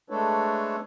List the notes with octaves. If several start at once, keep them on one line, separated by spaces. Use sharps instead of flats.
G#3 A3 D4 A4 B4 C#5